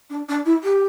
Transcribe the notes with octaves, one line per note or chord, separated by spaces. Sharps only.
D4
D4
E4
G4